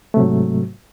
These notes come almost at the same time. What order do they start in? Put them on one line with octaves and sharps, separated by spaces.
A3 C3 F#3 G#2